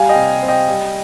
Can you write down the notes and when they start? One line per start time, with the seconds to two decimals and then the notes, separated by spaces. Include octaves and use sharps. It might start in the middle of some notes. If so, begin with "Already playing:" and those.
Already playing: G3 F5 G#5
0.09 D#5 G5
0.15 C3
0.43 C4
0.48 D#5 G5
0.68 G3